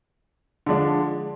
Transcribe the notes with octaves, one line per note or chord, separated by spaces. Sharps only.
D3 F3 G#3 D4